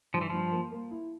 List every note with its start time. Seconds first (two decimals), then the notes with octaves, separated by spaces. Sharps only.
0.13 G2 F3
0.21 E3
0.30 G2 F3
0.52 A#3
0.71 A#3
0.91 E4